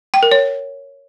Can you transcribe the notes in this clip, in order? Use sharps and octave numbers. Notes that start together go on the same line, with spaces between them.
G5
A#4
C#5